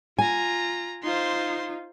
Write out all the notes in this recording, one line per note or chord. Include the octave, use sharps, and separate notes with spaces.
F4 G#5 A#5
D#4 F4 C5 C6